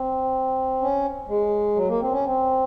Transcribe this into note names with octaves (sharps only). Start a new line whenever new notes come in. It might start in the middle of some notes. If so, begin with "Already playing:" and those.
Already playing: C4
C#4
G#3
F#3
A#3
C4
C#4
C4